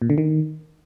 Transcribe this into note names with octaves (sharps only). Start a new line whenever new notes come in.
A#2
D3
D#3